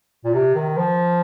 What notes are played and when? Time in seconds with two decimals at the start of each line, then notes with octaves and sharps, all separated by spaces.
0.25 A#2
0.34 C3
0.55 D#3
0.77 F3